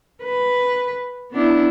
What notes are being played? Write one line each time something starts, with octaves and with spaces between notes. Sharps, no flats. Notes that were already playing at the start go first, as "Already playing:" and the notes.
B4
B3 D4 E4